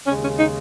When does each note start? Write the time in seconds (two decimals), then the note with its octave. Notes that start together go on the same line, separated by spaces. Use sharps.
0.06 D#2 C#3 G#3 C#4
0.22 C#4
0.38 D#4